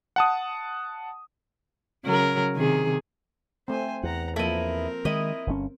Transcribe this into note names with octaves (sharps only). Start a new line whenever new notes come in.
F#5 A5 D#6
C#3 F#3 A#4
C3 D#3 G#4
A3 C4 C5 G#5
E2 F#5 A#5
F3 A#3 C4 E4 A4 A#4 D#5
D#3 G#3 E4 D#5
G1 A#2 C#4